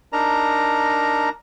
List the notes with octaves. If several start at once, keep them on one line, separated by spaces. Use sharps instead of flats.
D4 D#4 A#4 A#5